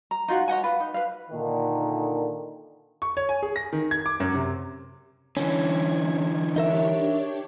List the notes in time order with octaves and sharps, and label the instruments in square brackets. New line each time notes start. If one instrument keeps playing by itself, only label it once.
[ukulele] A#5
D#4 F4 F#4 F#5
C#5 D#5 F#5 G#5
F4 B4
D#4
B4 F5
[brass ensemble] A#2 D3 D#3
[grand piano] C#6
C#5
G#5
G#4
A#6
D#3
G#6
D6
F#2
C3
[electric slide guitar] D3 E3 [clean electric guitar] C#4 [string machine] G#6
[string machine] D4 G4 C#5 [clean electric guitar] D#4 A#4 E5